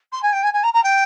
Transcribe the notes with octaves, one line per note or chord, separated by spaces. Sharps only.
C6
G#5
G5
G#5
G#5
A#5
A#5
G5